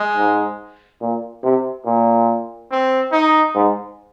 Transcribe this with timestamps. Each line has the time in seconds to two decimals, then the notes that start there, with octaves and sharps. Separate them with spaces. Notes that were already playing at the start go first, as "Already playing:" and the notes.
Already playing: G#3
0.17 G#2
1.01 A#2
1.43 C3
1.86 A#2
2.71 C4
3.12 D#4
3.55 G#2